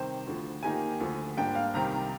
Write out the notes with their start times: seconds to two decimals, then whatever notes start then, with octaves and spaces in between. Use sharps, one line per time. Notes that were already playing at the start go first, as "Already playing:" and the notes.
Already playing: C3 D#3 G3 C5
0.27 D2 D3 F3
0.63 D#3 A#3 D#4 G4 A#4 G#5
1.00 D2 D3 F3
1.37 G#2 G3 A#3 D4 G5
1.55 F5
1.74 C2 C3 D#3 G3 A#5